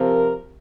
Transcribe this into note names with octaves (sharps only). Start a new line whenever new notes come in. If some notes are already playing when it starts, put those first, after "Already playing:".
Already playing: C3 F3 A#4